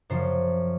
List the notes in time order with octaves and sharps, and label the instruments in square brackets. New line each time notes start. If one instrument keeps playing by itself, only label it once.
[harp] F#2 C#3 F3 C5